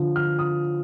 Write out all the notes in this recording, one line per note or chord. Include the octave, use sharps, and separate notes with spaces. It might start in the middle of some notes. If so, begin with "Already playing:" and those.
Already playing: D3 F3
F6
D#6